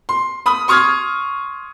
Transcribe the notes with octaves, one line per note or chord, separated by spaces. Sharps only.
C6
B5 D#6
C6 C#6 D#6 F6 G#6